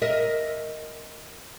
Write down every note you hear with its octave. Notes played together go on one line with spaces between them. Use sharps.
A#4 D#5 E5